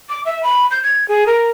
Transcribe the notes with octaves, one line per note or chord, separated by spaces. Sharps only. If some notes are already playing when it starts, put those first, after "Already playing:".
D6
E5
B5
G6
G#6
G#4
A#4